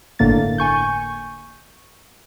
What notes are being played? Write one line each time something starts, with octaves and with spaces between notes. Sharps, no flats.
G1 A2 D3 A#3 A6
G#5 C#6 G6